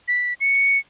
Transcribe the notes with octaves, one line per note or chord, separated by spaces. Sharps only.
B6
C#7